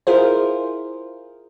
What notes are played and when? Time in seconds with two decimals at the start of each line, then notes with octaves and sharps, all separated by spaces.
0.07 E4 F4 G#4 A#4 C5